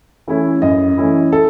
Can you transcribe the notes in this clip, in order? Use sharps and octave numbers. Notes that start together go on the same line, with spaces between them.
E3 A3 C#4 E4
F#2 D#5
E3 A3 C#4 E4
A4